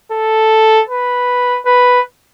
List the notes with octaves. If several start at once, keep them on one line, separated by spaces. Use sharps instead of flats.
A4
B4
B4